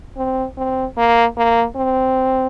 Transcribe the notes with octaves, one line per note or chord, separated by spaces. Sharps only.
C4
C4
A#3
A#3
C4